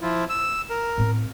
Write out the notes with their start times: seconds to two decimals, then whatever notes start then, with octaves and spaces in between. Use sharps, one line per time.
0.01 F3 E4 F4
0.29 E6
0.70 A#4
0.97 A2 C4